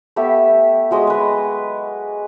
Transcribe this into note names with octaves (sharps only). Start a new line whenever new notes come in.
A3 B3 G4 E5
F#3 G#3 D#5 D#6
B4 G#5